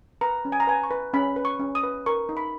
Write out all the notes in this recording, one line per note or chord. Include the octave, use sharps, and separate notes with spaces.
B4 A#5
C#4
G#5
A#5
B4 G#5
C#6
B4
C#4 B5
B4
C#6
C#4
D#6
B4
A#4 C#6
D#4
B5